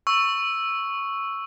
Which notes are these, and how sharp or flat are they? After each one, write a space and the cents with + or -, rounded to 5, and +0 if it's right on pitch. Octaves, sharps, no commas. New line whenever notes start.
C#6 +0 E6 +0